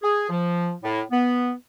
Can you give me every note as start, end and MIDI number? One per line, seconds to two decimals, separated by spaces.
0.03 0.27 68
0.29 0.72 53
0.83 1.02 45
1.11 1.52 59